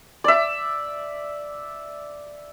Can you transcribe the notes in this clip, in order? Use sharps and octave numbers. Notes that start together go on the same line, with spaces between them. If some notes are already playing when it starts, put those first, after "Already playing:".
D5 E5